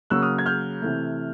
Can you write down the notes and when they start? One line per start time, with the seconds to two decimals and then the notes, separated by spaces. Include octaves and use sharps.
0.10 C#3 F#3 A#3 E6 F#6
0.22 D#6 F6
0.38 G#6
0.46 F6 G6
0.82 C3 E3 A3